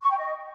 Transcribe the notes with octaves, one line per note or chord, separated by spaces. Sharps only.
C#6
G5
D#5